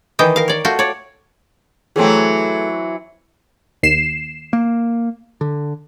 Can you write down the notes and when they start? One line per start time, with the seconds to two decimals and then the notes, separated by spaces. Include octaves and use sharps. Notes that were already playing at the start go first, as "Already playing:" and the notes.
0.19 D#3 E3 D#5 G5
0.36 A#4 F5
0.48 C#5 D5
0.65 A3 F4 F#4 G5
0.79 C#5 D5
1.96 E3 F#3 A3 C4 G#4
3.83 D#2 C7 E7
4.53 A#3
5.41 D3